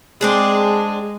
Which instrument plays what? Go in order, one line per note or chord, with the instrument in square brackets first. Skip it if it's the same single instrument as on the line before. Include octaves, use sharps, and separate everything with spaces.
[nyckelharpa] G#3 [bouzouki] C4 D4 G#4